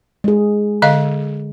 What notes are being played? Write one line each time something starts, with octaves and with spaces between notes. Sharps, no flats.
G#3 G#4
D3 D#5 F5